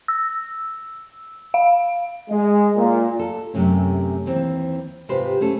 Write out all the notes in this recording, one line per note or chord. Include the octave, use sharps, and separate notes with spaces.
E6
F5
G#3
A#2
A4
F#2 C3 A3 C#4
D#2 E3 C4
G#2 C3 F4 G4 B4 C5
A3 C#4 A4